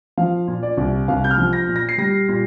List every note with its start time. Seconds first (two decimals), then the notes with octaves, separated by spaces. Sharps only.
0.17 F3 F5
0.48 A#2
0.63 D5
0.77 C2
1.08 C2 F5
1.24 G6
1.31 F6
1.38 F3
1.53 A#6
1.68 A#2
1.76 A#6
1.89 C7
1.98 G3 A#6
2.28 A#2